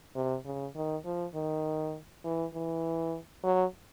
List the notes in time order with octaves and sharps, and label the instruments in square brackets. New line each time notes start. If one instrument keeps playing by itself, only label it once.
[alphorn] C3
C#3
D#3
F3
D#3
E3
E3
F#3